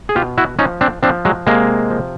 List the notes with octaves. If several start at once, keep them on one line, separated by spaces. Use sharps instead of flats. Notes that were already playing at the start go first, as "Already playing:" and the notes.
G#4
B2 F4 G4
E4 F#4
F3 C#4 D#4
C4 D4
F3 C4 D4
F#3 G#3
C3 G#3 A#3
F3